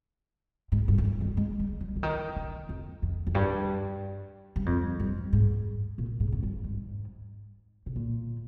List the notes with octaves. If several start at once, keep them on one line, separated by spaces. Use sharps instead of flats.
G#2
G2
F2
G2
D#3
G#3
G3
F3
D3
D#3
D3
F2
F2
F2
G2
G2
F2
G2
G#2
A#2
G#2
F2
G2
G#2
C3
A#2